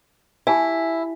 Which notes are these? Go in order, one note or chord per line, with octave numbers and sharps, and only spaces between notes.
E4 G4 G#5 A5